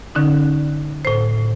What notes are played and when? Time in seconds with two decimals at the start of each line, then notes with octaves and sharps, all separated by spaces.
0.15 D3 C#4 D#4
1.05 A2 C5